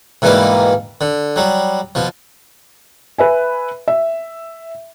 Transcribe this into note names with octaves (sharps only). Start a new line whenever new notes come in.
G#2 B2 E3 G3 A#3 D6
D3
F#3 G3
B2 F3
B4 E5 G#5
E5